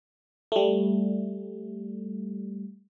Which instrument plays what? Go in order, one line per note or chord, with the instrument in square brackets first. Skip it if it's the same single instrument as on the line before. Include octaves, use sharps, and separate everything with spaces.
[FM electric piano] G3 A3